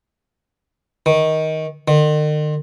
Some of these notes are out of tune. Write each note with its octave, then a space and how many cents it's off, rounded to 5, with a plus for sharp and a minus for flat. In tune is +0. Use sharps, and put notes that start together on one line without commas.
D#3 +15
D#3 -45